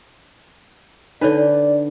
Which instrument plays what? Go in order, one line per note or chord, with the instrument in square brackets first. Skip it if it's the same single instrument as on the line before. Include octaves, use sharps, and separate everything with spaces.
[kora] D3 B4 [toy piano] D4 D#4 C#5 [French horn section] D5